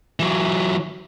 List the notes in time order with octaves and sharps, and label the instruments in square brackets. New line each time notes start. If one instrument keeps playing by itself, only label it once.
[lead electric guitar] E3 F#3